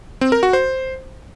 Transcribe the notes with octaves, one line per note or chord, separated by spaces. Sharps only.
C4
A#4
F#4
C5